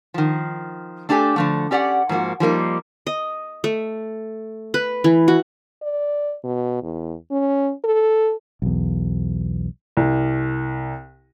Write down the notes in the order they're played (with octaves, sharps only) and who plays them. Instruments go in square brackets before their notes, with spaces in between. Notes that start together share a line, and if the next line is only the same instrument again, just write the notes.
[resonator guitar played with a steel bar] D#3 F3
A3 D4 F#4 G4 A4 G#5
D3 F3 A3
C#4 G4 D5 F5 F#5
G#2 F3 A#3 F#4
F3 G3 A#3 D#4
[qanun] D#5
A3
B4
E3
F#4
[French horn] D5
B2
E2
C#4
A4
[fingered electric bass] B1 E2
[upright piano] C2